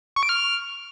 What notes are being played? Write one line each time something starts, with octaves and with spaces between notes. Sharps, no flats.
C#6
D7
F6